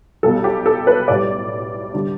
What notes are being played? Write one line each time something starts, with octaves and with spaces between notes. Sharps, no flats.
B1 B2 G3 A4
G4
A4
B4
B1 A2 G3 D5
D3 G3